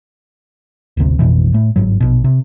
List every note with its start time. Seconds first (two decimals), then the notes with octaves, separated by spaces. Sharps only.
0.97 D1 G1 D2 C3
1.19 A1 F2 B2 E3
1.54 A2 A3
1.76 G1 G#2 F#3
2.00 A#1 B2
2.24 C3